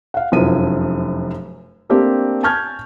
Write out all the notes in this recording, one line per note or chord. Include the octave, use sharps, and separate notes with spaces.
F5 F#5
F1 F#2 F3 E4 B4 D#7
A3 A#3 C4 D4 G4
G#5 A5 C#6 F6 G6 G#6